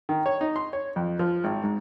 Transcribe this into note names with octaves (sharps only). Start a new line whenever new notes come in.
D#3
C#5
D#4
C6
C#5
F2
F3
G#1
G#2